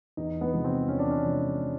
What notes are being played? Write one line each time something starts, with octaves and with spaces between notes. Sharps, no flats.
E2 D#4
B3
C3 F3 G#3
C4
E2 C#4
D4
C#4
C3 F3 G#3